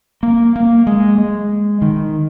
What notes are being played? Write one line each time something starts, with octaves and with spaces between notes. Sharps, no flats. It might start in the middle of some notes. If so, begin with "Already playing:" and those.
A#3
A#3
G#3
G#3
D#3